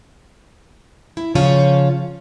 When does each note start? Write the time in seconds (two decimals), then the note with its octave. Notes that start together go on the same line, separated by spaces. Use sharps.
1.17 E4
1.35 C#3 F3 C#4 F4 C#5 A5